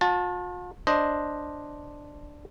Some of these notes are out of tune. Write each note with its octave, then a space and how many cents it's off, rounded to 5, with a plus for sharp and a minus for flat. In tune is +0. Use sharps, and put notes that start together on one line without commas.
F4 +45 A5 +0
D4 +0 C5 +0 D#5 +0